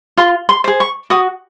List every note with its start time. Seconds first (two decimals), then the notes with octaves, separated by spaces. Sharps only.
0.17 F4 C6
0.49 C6
0.64 G#4 C5
0.80 C#6
1.10 F#4 D#6